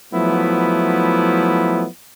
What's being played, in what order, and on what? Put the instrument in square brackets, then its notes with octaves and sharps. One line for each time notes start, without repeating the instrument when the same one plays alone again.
[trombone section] F3 F#3 A3 B3 E4